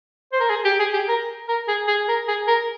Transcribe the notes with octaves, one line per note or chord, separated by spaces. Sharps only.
C5
A#4
G#4
G4
G#4
G4
A#4
A#4
G#4
G#4
A#4
G#4
A#4